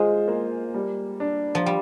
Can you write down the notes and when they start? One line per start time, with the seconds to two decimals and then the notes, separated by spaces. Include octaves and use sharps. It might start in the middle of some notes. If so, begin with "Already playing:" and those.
Already playing: G#3 F4 C5
0.28 A#3
0.74 G3
1.20 D4
1.55 F3
1.66 G3